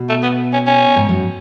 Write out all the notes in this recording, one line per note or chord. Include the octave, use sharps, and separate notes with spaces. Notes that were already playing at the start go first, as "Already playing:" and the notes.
Already playing: B2
A3
B3
C#4
C#4
G#2
F#2